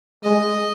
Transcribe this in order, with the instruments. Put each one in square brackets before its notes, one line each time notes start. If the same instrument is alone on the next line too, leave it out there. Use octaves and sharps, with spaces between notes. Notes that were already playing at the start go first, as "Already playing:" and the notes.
[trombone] G#3 [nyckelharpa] D#5